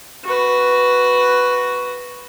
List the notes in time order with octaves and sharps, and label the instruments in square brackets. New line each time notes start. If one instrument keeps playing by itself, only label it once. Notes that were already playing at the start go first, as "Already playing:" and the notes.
[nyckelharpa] F#4 B4